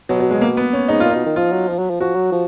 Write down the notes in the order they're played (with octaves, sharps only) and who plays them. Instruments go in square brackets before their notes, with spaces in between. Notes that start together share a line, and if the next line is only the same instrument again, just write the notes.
[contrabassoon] B2 [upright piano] F#3
[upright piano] F#3
G#3
A#3
B3
C#4
[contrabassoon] G#2 [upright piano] D#4
[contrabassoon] A#2 [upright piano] F4
[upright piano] D#4
[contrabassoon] B2
D#3
[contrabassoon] F3 [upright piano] F4
[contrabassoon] F#3
F3
F#3
F3
[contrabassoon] F3 [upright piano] F#4
[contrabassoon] F#3
F3